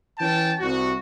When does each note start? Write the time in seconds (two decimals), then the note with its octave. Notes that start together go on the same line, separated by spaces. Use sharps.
0.19 E3 C#4 G5 A5
0.60 C2 F#4